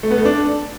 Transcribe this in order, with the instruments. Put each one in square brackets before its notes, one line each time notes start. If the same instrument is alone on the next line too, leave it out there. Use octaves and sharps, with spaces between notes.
[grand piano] A3
B3
A3
D4